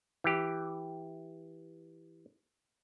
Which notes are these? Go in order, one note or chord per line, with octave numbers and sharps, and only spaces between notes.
E3 G4